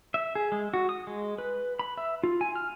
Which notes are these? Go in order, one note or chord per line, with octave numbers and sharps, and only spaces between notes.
E5
G#4
G#3
F#4
D#6
G#3
B4
B5
E5
F4
G#5
F6